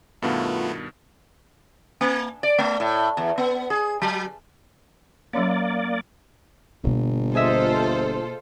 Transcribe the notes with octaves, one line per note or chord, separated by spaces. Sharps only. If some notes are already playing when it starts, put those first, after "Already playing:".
G2 B2 D#3 A3 B3 F4
A#3
D5
A3
A2
E2
B3
G#4
F#3
F#3 A#3 C#4 C#5 D5
G1 B2 A#3
F4 G#4 A4 C5 D#5 E5